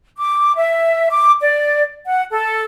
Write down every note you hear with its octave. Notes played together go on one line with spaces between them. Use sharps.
D6
E5
D6
D5
F#5
A4